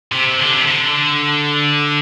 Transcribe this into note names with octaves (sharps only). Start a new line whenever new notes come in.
C3
D3
C3
D3